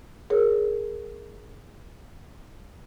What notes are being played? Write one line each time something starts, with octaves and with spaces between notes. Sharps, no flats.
G#4 A#4 C#5